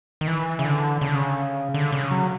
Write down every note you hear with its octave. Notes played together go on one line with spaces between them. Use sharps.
D#3
E3
C#3
D3
C#3
D3
C#3
D3
C#3
F#3